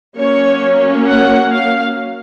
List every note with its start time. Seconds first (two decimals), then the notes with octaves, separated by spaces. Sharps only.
0.16 F#3 A#3 C#4 C#5
1.06 F#5
1.51 F5